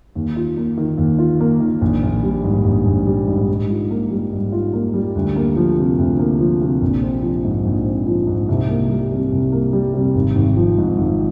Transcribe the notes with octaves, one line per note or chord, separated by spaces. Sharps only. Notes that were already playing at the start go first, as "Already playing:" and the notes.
D#2
F4
A#3
D#3
D#2
F4
A#3
D#3
A#1
A#1
G3
G#2
A#1
A#1
G3
G#2
G#2
F4
A#3
G3
G#2
F4
A#3
G3
D2
A#3
F3
C3
D2
A#3
F3
C3
A#1
C4
F3
G#2
A#1
C4
F3
G#2
C2
A#3
G3
C3
C2
A#3
G3
C3
G#1
G#1
F3
G#2
G#1